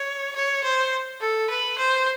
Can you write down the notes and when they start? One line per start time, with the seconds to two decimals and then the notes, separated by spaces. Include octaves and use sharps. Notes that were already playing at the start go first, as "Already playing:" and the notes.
Already playing: C#5
0.35 C#5
0.63 C5
1.20 A4
1.49 B4
1.78 C5